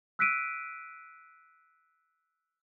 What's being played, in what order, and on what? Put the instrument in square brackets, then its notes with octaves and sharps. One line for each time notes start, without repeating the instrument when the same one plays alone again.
[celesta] E6 F#6 B6 C7 D7 D#7